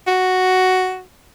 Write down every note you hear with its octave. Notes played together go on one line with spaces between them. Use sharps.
F#4